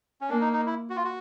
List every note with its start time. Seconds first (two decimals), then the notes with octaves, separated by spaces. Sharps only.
0.21 C#4
0.30 A#3 D4
0.41 D#4
0.53 D#4
0.66 E4
0.90 F#4
0.96 F4
1.04 F#4